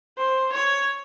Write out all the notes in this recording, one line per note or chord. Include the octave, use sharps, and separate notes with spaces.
C5
C#5